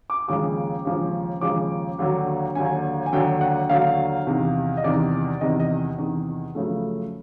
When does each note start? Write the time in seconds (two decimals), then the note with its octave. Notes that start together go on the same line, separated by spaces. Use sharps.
0.10 D6
0.28 D#2 C#3 F3 G#3 D6
0.85 D#2 C#3 F3 G#3
1.41 D#2 C#3 F3 G#3 D6
1.99 D#2 D3 F#3
2.55 D#2 D3 F#3 G#5
3.06 G#5
3.13 D#2 D3 F#3 G5
3.41 F#5
3.70 D#2 D3 F#3 F5
4.27 E2 C3 D#3
4.77 D#5
4.84 E2 C3 D#3 D5
5.41 E2 C3 D#3 D#5
5.60 D#5
5.98 E2 C3 D#3
6.55 F#2 C#3 F3 A3